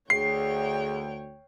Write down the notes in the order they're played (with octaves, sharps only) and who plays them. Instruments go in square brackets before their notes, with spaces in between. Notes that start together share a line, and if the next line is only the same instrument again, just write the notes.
[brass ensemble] D2 [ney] G#4 [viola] C#5 G5 [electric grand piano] C7